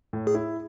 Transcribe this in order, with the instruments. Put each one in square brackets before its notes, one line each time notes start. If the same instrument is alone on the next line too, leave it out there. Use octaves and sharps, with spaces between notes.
[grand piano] A2
[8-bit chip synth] G#4
[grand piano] E4